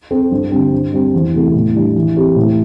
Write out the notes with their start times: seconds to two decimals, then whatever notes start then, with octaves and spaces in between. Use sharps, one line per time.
0.11 C4 A4
0.31 G2
0.52 D3 G3 C4
0.72 G2
0.93 G3 C4
1.13 E2
1.34 C3 A3 E4 A4
1.55 A2
1.74 E3 G3 D4
1.96 E3
2.17 C4 G4
2.36 A2